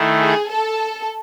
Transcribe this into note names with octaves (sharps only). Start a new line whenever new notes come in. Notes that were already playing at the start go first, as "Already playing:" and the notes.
Already playing: D#3 A3 E4
G#4
A4